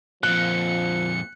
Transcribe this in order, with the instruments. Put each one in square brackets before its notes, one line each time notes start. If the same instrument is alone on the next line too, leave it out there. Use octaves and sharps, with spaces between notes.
[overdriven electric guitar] F2 A#2 [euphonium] F3 [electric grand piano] F#6 [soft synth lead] C#7